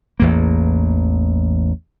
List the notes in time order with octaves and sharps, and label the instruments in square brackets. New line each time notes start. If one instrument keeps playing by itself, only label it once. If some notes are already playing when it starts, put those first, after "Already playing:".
[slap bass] A1 E2 A#3